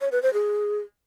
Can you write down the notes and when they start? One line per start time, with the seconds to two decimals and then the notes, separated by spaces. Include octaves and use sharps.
0.01 C#5
0.12 B4
0.23 C5
0.33 G#4